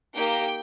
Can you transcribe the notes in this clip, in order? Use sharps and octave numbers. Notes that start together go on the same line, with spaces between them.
A#3 D#4 G4 G5